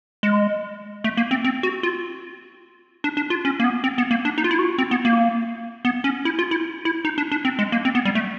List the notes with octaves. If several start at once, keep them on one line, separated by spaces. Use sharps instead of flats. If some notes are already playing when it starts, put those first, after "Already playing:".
G#3
A3
A#3
C4
C4
F#4
F4
D4
D4
F4
C#4
A#3
B3
C4
B3
A#3
D4
D#4
F4
E4
F#4
F4
C4
B3
A#3
B3
C#4
E4
F4
E4
E4
D#4
D4
D4
C4
G#3
A#3
C4
B3
G3
A3